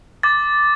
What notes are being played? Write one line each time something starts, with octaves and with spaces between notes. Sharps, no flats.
D6 A6